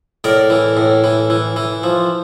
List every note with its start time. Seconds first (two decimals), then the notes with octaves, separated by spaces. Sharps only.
0.24 A2 A#4 D5
0.50 E3
0.77 A2
1.04 E3
1.30 E3
1.56 E3
1.83 F3